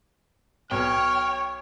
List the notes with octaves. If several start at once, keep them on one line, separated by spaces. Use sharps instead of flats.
B1 C#5 G5 F6